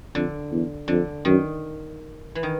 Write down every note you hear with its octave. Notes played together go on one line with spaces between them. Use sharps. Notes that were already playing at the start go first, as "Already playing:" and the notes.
F2 D3
E2
F2 D3
F#2 D#3
E3
D#3